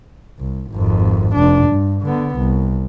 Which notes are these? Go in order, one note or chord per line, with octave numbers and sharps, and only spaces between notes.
C2
G#1 F2
F1 D4
G2
D3 B3
C2